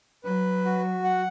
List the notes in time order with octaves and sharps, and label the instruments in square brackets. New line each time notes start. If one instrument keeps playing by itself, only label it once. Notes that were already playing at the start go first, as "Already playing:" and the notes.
[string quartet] F#3 [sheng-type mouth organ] B4
[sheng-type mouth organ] F#4
F#5